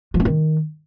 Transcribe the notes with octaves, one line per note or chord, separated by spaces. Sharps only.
F3
C4
D#3